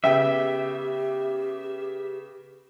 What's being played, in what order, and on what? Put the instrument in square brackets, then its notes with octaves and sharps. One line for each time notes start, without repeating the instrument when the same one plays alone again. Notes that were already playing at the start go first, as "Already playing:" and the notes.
[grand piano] C#3 B3 G5 [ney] G4 [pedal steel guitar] E5